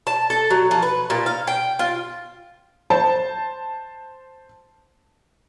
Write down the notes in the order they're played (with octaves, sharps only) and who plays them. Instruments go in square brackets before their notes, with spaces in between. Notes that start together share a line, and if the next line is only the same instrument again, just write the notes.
[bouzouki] A5
A4
F#3
F3
B4
A#2
F5
G5
F4
[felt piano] C5 A5